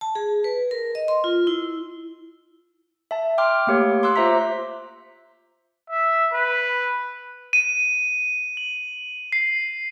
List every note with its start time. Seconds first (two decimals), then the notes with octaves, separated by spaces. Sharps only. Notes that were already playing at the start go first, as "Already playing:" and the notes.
0.01 A5
0.15 G#4
0.44 B4
0.71 A#4
0.95 D#5
1.08 C6
1.24 F4
1.47 E4
3.11 E5 A5
3.38 G5 C6 D6 F6
3.67 A3 A#3 G4 C#5
4.03 C6 D6 E6 F#6
4.16 F4 C5 E5 A#5 B6
5.90 E5
6.33 B4
7.53 D#7
8.57 F#7
9.32 C7